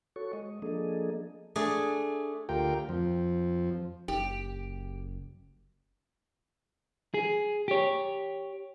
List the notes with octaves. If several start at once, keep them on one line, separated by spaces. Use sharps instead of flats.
F#4 A4 C#5 C#6
G#3 D#5
F3 A#3 D4 G#4 A4 D#5
A3 D4 G#4
D2 F4 G4 A#4 G5
F2 F3
F#1 G4
G#4
G4 C#5